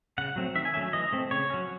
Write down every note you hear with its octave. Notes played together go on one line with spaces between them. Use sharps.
C#3 F#5
F#3 A3 C4
D#3 E5
G#5
F#3 A3 C#4 E5
E3 D#5
A3 C4
C#3 C#5
F#3 C#4